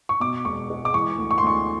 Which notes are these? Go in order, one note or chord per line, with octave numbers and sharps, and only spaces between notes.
C#6
B2 D6
E1 C#6
G#3
D6
E3 C#6
D2
C#6
C6
D2 C#6